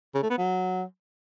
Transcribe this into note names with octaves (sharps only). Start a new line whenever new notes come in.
C#3
A3
B3
F#3